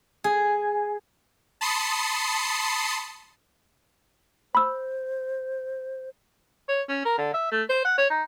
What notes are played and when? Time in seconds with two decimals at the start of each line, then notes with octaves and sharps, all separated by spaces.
0.24 G#4
1.61 A5 B5 C6 D#6 C7 C#7
4.55 C5 B5 E6
6.69 C#5
6.89 C#4
7.05 A#4
7.18 D3
7.34 E5
7.52 A3
7.69 C5
7.85 F#5
7.98 C#5
8.10 D#4